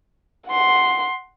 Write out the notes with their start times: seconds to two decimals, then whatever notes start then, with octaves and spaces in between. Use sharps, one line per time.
0.47 F#5 C6